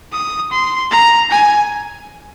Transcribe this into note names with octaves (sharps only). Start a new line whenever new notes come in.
D#6
C6
A#5
G#5